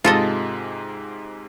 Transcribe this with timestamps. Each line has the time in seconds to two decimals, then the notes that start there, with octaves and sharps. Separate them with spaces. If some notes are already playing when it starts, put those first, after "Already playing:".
0.04 G#2 C3 G#3 F4 A4 D#5